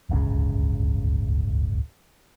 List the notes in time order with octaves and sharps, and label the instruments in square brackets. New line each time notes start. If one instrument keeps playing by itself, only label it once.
[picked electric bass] D1 G1 C#2 C#3